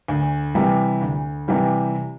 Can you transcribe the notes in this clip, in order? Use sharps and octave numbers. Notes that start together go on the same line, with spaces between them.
D2
C3 E3 G3
D2
C3 E3 G3